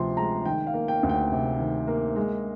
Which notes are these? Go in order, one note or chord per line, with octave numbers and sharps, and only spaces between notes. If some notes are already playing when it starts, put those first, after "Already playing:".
Already playing: D2 C3 F3 C6
G#3 A#5
D#3 G5
F5
A#3
G5
D2
G5
C3
D#3
A#3
G#3